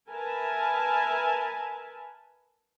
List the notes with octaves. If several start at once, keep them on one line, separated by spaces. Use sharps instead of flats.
A#4 B4 E5 G#5 A5